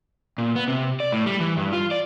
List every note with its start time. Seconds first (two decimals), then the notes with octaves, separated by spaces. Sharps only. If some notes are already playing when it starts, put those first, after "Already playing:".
0.38 A#2
0.55 B3
0.68 C3
1.00 D5
1.12 A2
1.26 G3
1.40 E3
1.57 G2
1.73 F4
1.91 D5